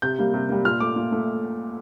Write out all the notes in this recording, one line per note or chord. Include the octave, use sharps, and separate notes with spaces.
C3 G6
G3 A#3
C3
G3 A#3
A#2 F6
A3 D6
A#2
A3